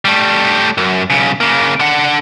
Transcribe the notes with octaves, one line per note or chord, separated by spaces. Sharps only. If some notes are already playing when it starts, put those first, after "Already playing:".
G3 A3
F#2
B1 C#3
C#3 A#3
D3 F#5